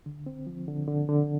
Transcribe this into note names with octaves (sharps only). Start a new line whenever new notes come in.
D3
C4
F3
D3
D3
D3